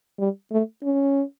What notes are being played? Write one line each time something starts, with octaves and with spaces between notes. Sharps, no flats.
G3
A3
C#4